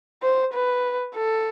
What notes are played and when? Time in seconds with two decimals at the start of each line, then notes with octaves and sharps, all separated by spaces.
0.23 C5
0.54 B4
1.15 A4